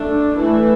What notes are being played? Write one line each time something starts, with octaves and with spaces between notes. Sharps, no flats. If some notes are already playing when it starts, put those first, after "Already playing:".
Already playing: A3 D4
E3 A3 E4